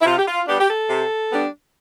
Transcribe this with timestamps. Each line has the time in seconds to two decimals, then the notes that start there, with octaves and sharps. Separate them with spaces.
0.02 E4
0.05 C3 F4
0.19 G4
0.27 F4
0.48 G3 B3 D4 G4
0.60 G4
0.69 A4
0.90 C3
1.31 G3 B3 D4